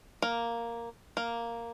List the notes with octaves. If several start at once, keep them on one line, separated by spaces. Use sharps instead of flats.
A#3
A#3